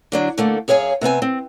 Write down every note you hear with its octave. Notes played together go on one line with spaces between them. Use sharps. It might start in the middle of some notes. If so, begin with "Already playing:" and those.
D3 F#3 D4
D3 A3 A#3
F#2 G#4 C#5 F5 G#5
C3 B3 C4 G#5
C4